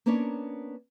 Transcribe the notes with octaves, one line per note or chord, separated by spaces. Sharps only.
A#3 B3 C#4 D4 A#4 C#5